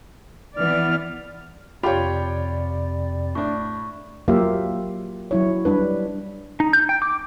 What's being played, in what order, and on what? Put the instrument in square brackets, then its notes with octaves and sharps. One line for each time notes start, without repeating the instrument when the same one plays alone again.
[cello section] E3 B3 D5 [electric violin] F6
[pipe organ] F2 C3 D5 [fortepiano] F4 C#5 [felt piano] G4 G5 [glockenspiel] B5
[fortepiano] A2 D4 [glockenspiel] C#6
[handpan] F#3 A#3 F4 G4 E5 F5
F#3 E4 C#5
G3 D4 B4
[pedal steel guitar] D#4
G6
G5
D6